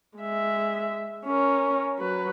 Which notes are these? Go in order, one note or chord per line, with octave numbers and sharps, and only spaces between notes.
G#3 E5
C#4 A#4
F#3 B4